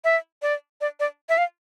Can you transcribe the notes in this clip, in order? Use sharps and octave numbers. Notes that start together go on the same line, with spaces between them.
E5
D5
D5
D5
E5
F5